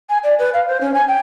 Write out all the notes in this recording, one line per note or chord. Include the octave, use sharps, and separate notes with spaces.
G#5
D5
B4
F5
C5
C#4
G#5
G5